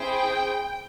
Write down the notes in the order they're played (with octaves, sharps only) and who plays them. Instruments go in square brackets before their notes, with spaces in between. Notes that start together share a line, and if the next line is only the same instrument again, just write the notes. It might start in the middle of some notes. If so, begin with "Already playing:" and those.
Already playing: [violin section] C4 E4 G#4 G5